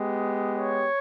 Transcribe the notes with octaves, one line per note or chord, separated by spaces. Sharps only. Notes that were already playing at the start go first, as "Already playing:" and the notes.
Already playing: G#3 B3 G4
C#5